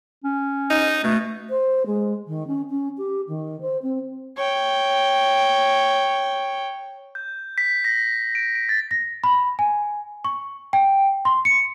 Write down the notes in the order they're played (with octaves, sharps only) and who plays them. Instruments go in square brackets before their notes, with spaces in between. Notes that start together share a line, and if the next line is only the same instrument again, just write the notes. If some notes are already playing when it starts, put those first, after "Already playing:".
[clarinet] C#4
[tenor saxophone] D#4
[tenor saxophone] B2 [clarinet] A3
[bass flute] C5
G#3
D#3
C#4
C#4
G4
D#3
C5
C4
[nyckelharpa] C#5 G5
[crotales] G6
B6
A#6
D7
D7
A6
[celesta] A#6
B5
G#5
C#6
G5
C6
C#7